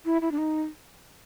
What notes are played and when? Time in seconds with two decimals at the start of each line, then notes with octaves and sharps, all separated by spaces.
0.05 E4
0.21 E4
0.31 D4
0.38 D#4